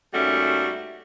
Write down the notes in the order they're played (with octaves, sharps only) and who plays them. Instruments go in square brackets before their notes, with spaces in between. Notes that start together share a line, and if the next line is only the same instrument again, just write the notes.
[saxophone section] D#2 G3 A3 C#4 F#4 E5